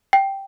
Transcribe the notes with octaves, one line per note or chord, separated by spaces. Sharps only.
G5